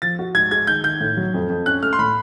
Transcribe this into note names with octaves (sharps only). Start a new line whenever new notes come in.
F3 A6
F#4
G#2 G#6
G#3 G#6
D#3 G6
D#3 G6
A2
F#3
F2
F2
C#4 F#6
A3 F6
C6
A2 B5